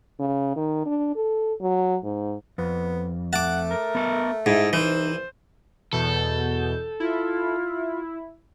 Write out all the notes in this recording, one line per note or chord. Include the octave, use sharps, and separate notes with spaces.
C#3
D#3
D4
A4
F#3
G#2
F2 B3
A3 F#5 A5 D6
A#4
B3 A4
G#2 D#4 E4
C2 E3 C5
E2 B2 A4 G6
E4 F4